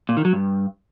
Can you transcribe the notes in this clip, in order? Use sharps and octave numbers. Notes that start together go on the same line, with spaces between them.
A#2
D#3
F#3
G2